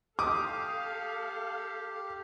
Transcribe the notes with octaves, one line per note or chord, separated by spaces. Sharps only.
G4 A4 F5 D6 D#6